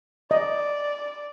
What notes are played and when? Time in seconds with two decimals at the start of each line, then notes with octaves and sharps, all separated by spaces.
0.31 D5 D#5